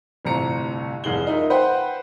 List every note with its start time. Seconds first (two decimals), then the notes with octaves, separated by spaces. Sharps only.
0.25 G1 A2 C3 F4 A#5 C#7
1.04 F1 C2 G#4 F#7 G7
1.27 D#4 F4 A#4 E5
1.50 B4 C5 F#5 G5 B5